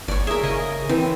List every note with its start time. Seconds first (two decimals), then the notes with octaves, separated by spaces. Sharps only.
0.08 G1 C#5 D5
0.27 G#4 A#4 E5
0.44 C#3 D#5
0.89 E3 C4